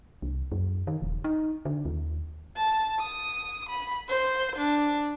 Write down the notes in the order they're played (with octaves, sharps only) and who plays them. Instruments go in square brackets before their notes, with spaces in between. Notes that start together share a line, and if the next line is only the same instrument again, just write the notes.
[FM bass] C2
F#2
D#3
D#1
D#4
D3
D#2
[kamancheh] A5
D#6
B5
C5
D4